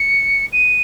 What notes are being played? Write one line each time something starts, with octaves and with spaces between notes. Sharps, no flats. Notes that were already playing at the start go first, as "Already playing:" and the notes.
Already playing: C#7
D#7